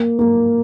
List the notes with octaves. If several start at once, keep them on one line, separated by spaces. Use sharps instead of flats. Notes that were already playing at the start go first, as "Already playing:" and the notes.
Already playing: A#3
A#3